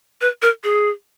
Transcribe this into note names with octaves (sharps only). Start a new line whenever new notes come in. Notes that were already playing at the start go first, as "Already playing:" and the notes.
B4
A#4
G#4